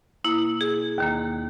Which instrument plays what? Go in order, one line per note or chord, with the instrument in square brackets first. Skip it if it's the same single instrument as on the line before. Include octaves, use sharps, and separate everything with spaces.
[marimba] B2 A#3 E4
G#4
D#2 D#3 A#3